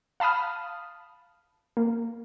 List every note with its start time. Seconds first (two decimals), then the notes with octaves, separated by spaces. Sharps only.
0.20 F5 A5 B5 D#6 F6
1.77 A#3